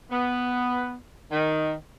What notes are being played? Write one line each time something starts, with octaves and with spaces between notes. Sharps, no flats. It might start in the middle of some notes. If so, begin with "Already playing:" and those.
B3
D#3